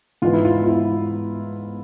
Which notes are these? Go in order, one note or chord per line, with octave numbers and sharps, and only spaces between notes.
G#2 E3 F4
E4
F4
F4
E4